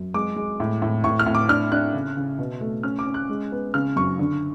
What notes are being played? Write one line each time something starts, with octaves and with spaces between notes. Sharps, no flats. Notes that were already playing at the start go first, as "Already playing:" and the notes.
Already playing: F#2
G#3 D6
G#3
A2
A2
A2 C#6
F6
A2
D6
D4 F6
D4 F#6
C#3
C#3
B2
A3
C#4 F6
D6
C#4
F#6
G#3
B3
C#3 F6
F#2 C#6
D3